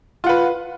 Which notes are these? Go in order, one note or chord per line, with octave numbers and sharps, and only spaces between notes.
F4 B4 F#5